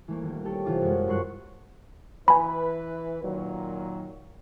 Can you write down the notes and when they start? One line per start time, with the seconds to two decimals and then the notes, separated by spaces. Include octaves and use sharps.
0.08 E3 A3 A#3
0.23 D#1
0.44 G4 A4 C#5
0.65 C3 E3 F4 D6
0.82 F#2 F#3 G#3
1.07 G2 F3 A#4 C6 C#6 F#6
2.28 E3 B4 G#5 B5
3.23 A#2 D#3 F#3